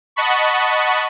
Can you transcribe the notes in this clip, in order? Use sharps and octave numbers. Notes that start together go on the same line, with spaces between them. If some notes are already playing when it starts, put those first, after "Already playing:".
D#5 F#5 A5 B5 C#6